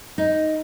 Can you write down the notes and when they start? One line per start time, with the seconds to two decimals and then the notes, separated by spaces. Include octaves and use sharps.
0.18 D#4